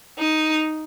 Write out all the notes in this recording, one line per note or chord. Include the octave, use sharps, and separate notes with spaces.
D#4